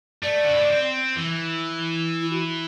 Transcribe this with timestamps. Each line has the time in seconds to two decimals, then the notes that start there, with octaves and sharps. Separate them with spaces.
0.23 A3 D5
0.44 F#4
0.53 E4
0.61 D4
0.69 C4
1.16 E3
2.21 E4
2.31 F#4